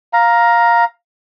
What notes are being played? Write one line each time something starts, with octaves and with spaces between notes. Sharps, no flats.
F5 A#5